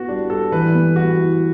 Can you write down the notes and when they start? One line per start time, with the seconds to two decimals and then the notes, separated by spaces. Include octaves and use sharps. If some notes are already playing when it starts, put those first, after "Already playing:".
Already playing: B3 E4 F#4
0.08 G3 D4
0.30 G3 A4
0.52 E3 B4
0.74 B3
0.96 G3 F#4
1.19 E4